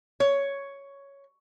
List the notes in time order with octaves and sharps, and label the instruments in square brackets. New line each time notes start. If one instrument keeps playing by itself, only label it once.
[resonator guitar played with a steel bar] C#5